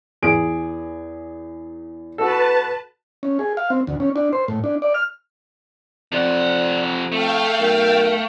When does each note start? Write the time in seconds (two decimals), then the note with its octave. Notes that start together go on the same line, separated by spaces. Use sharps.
0.22 E2 G#4 D7
2.18 F#4 A4 B4 A5
3.23 C#4
3.39 G#4
3.57 F5
3.70 C4
3.87 D2
4.00 C#4
4.16 D4
4.33 C5
4.48 A2
4.64 D4
4.82 D5
4.94 F6
6.12 F2 C3 D5 F#5
7.12 A3 A4 F5 G5
7.59 B1 A#4